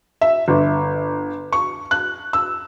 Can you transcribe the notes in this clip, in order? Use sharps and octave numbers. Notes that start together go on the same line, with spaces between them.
E5
G1
C#6
F#6
E6